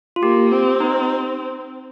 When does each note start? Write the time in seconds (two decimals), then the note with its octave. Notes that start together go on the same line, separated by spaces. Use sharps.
0.16 F4
0.22 A#3 G4
0.52 C4
0.80 D#4